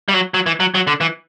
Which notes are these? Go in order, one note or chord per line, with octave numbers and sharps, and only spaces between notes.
G3
F#3
F#3
E3
F#3
F#3
D3
E3